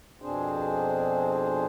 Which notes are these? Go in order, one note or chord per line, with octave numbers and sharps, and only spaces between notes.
F2 B2 C4 D4 G#4 C5